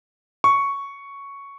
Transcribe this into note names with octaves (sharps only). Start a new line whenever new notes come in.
C#6